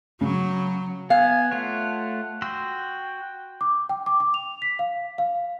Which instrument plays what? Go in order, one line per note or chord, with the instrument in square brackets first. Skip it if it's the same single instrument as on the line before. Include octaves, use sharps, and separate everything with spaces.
[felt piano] C#3 [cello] F#3
[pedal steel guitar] B3 [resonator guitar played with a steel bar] F5 [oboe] G#5
[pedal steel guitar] A3 F4 C#5 [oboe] F#5
[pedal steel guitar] F#4 C6 E6 [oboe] G5
[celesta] D6
G5
D6
D6
F7
B6
F5
F5